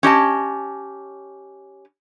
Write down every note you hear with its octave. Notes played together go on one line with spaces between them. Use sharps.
C#4 G4 D#5 A5